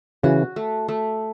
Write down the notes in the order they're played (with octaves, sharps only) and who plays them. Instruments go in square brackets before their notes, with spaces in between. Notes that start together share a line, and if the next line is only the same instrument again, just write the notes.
[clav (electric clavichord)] C#3 E3 [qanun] F#4
[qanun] A3
A3